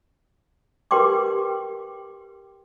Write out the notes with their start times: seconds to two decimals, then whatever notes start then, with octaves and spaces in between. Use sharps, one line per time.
0.91 G4 A#4 B4 G5 C6 D6